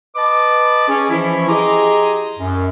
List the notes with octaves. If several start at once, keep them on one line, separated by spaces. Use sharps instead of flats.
B4 D#5 A5 D6
C#4 G#4
E3 F3 C#4 E4
G4 G#4 D#5 A#5 C6 D6
F#2